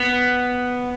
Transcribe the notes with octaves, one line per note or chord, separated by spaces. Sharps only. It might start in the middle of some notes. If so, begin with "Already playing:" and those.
Already playing: B3